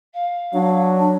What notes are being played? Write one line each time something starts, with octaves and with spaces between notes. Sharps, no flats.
F5
F#3 D4